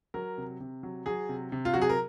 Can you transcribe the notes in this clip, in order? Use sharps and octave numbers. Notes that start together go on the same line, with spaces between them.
F#3 A#4
C3
C3
F#3
F#3 G#4
C3
C3
F4
F#3 F#4
G#4
A#4